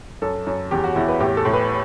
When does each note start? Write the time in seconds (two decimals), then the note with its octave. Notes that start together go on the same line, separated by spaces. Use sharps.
0.22 F#2 A4
0.46 F#2
0.71 E2 G4
0.84 F#4
0.96 E2 E4
1.08 B4
1.20 A2 G4
1.37 A4
1.45 A2
1.53 B4